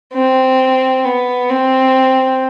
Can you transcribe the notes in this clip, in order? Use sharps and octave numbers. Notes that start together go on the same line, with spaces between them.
C4
B3
C4